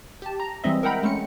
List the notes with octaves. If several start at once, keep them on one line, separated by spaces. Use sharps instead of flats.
G4 A5
A#5
E3 G3 G#3 C4 D#5 E5
A#4 E5 F#5 G5 A#5 B5
G#3 A3 C#4 C#7